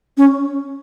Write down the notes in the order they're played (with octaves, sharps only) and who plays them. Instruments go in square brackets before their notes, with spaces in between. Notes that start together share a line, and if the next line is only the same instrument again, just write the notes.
[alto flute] C#4